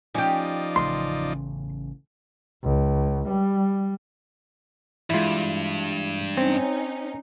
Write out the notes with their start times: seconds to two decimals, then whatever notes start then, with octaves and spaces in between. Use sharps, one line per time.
0.15 F3 C#4 D#4 G4 D5
0.76 A1 C#3 A3 C6
2.64 C#2
3.29 G3
5.10 G2 E3 G#3 E4 F4
6.37 C4 C#4 D#4